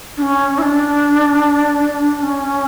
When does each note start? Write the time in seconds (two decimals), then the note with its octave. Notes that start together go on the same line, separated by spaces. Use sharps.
0.18 D4
0.22 C#4
0.58 E4
0.62 D4
2.23 C#4